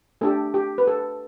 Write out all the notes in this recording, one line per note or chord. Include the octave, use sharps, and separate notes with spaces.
A3 D4 G4 A4
G4
B4
A4